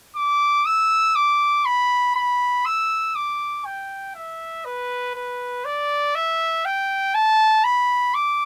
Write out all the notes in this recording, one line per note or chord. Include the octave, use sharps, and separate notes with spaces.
D6
E6
D6
B5
B5
E6
D6
G5
E5
B4
B4
D5
E5
G5
A5
B5
D6